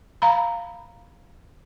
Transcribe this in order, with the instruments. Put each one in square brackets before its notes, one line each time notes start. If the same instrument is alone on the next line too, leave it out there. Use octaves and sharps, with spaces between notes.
[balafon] F5 A#5 B5